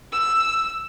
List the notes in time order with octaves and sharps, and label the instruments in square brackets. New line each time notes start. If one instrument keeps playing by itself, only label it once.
[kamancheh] E6